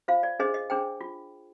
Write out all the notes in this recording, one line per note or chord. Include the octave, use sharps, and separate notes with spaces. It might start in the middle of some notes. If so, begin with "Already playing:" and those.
F4 C5 F5
D5
D4 G#4 C5 D#5
D#5
D4 G#4 C5 G5
F4